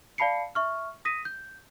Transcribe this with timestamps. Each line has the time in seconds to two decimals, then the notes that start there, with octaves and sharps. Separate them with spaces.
0.18 D5 F5 A5 B5 C7 C#7
0.55 E5 C#6 F6
1.05 D#6 A#6 B6 D#7
1.25 G6